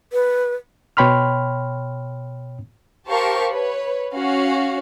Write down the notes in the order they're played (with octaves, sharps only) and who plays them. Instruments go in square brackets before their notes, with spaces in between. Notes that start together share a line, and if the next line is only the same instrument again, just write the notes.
[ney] B4
[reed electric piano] B2 C#5 G5 B5 C6 F6
[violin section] G4 A#4 C5 F5 A5 C#6
B4 C#5
C#4 F#4 F5